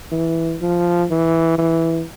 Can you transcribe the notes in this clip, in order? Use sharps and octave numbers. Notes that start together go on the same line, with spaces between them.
E3
F3
E3
E3